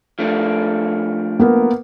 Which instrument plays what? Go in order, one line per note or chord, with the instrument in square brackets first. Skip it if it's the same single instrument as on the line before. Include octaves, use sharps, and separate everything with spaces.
[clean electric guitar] F3 A3 D4
[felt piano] A#3 B3 A#4